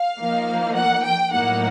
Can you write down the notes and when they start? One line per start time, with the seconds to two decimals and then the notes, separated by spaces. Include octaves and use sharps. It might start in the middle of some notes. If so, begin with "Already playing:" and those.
Already playing: F5
0.19 F3 A#3 D#4
0.75 F#5
1.05 G5
1.33 A2 F#3 A#3 D#4 F#5